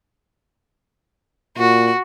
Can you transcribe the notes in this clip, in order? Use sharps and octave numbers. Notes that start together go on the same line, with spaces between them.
A#2 F#4